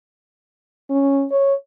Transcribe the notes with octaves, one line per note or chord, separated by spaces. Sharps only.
C#4
C#5